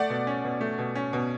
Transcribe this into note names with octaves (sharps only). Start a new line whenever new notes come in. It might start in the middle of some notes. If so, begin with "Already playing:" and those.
Already playing: A3 D5 F#5
B2
C#4
B2
A3
B2
C#4
B2